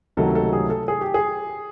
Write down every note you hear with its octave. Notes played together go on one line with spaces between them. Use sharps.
C#2 C3 D#3 F#3 A3 A4
A4
G#4
A4
G#4
G4
G#4